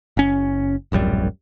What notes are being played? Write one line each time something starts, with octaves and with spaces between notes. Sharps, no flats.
F#1 C#4
D1 A#1 F#2 G3